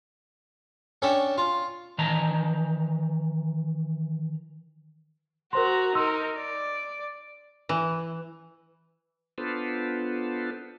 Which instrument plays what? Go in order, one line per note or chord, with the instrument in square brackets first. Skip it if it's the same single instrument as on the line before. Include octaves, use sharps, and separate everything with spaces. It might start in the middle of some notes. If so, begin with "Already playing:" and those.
[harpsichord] C#4 D4 A4 E5 G5
F4
[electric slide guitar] D#3 E3 A5 A#5
[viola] F#4 A#5 [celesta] A#4 C5 C6
[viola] D#4 A#4 [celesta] C6 E6
[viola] D5
[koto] E3
[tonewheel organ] B3 D4 F4 A4 B4 C5